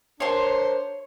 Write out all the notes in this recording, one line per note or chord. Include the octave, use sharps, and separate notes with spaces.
D4 A#4 C5 C#5 C6